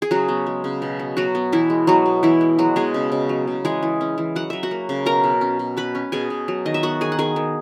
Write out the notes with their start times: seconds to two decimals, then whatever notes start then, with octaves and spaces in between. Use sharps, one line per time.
0.02 G#4
0.11 C#3 F#3 F#4
0.29 B3
0.47 G#3
0.64 C#3
0.82 B2
0.99 B3
1.17 B2 F#3 F#4
1.35 B3
1.52 B2 E3 E4
1.70 G#3
1.87 F#3 B3 F#4
2.06 B2
2.23 B2 E3 E4
2.41 G#3
2.59 F#3 G#3 F#4
2.76 B2 G#3 G#4
2.94 C#3
3.12 C#3
3.29 F#3
3.47 C#3
3.65 E3 G#3 G#4
3.83 E3
4.01 C#4
4.18 E3
4.36 F#3 F#5
4.50 F#3 E5
4.63 F#4 F#5
4.71 A#3
4.89 C#3
5.06 B2 A#4 A#5
5.24 B2
5.41 C#4
5.59 B2
5.77 C#4 B4 B5
5.95 C#4
6.12 B2 G#4 G#5
6.30 B2
6.48 F#3
6.66 D#3 D#5
6.74 E5
6.83 B3 F#4 F#5
7.01 D#3 G#4 G#5
7.12 F#5
7.19 D#3 G#4 G#5
7.36 D#3